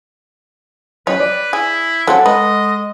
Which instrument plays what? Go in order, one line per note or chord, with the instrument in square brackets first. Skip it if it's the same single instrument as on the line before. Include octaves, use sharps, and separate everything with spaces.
[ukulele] C#4 G4 D#5 [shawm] B4 [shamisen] C#5
[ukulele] D5
[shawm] E4 [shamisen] G#4
[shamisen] F#3 C4 C#4 [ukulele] A4 F#5
[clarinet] G#3 [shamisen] B4 [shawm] D#5